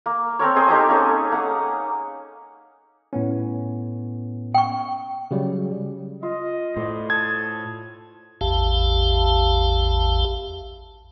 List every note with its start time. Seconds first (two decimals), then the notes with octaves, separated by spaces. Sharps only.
0.06 A#3
0.39 C4 A4 A#4 C#5
0.56 C4 G#4 G5
0.68 D#4 G4 A4 A#5
0.89 A#3 C#4 G#4 A4
1.32 A#3 F#5
3.13 A2 B3 C#4
4.54 G5 C#6
5.31 C#3 F#3 G3
6.23 F4 D#5
6.77 A2 C5 D5 F5
7.10 A4 A5 D#6 G#6
8.41 A1 E2 G4 F5 A5